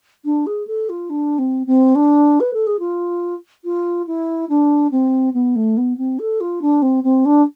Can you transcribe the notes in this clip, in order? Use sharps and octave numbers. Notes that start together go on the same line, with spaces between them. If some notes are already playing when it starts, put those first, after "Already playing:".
D4
G#4
A4
F4
D4
C4
C4
D4
B4
A4
G#4
F4
F4
E4
D4
C4
B3
A3
B3
C4
A4
F4
D4
C4
C4
D4